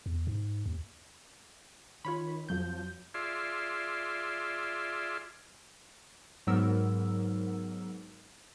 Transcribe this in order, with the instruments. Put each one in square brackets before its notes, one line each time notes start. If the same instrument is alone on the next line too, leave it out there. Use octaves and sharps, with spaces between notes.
[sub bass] E2
G#2
D#2
[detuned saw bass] D#3 [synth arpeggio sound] F4 C#5 B5
[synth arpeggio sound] F2 F#3 G6 [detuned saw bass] F3
[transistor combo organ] F4 G#4 D5 E5 C6
[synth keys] G#2 F#3 B3 A#4 E6